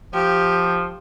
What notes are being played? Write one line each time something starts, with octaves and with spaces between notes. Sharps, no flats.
F3 G4